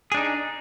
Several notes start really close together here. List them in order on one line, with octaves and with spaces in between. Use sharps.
G#4 D4 D#4